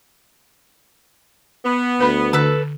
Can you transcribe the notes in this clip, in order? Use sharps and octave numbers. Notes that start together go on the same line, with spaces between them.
B3
D2 B4 B5
D3 A4 B4